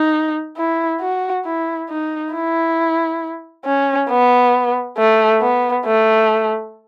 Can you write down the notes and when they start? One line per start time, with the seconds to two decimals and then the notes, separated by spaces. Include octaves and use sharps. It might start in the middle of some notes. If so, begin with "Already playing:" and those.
Already playing: D#4
0.57 E4
1.01 F#4
1.46 E4
1.90 D#4
2.34 E4
3.65 C#4
4.10 B3
4.98 A3
5.41 B3
5.86 A3